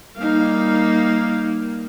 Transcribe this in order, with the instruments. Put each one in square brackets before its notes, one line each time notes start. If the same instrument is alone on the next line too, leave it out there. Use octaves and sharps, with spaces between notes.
[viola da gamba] G3 A#3 [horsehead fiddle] D#4 F5